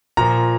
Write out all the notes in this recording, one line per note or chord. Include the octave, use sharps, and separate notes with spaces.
A#2 F3 A#5